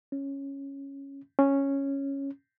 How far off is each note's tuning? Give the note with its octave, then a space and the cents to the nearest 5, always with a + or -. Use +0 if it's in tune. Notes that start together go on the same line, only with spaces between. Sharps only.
C#4 -5
C#4 -5